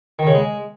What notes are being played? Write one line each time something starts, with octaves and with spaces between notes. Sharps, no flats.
D#3
C#3
G#3